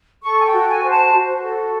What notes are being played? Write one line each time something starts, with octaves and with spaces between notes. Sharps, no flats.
A4 C#6
G#5
G5
F#4
G#5
C5
A5
F#4
A4